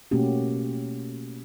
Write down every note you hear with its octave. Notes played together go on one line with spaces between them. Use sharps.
B2 A3 A#3 C#4 F#4 G4